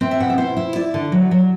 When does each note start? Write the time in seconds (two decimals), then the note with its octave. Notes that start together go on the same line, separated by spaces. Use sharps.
0.01 C4 E5
0.11 E5
0.20 B2 F#5
0.30 E5
0.38 E4 C5
0.57 E4
0.75 E4 D5
0.94 D3
1.12 F#3
1.31 F#3